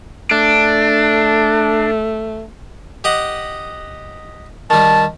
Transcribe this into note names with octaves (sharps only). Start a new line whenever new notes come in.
A3 D4
G4 D#5 F#5
D#3 G3 A5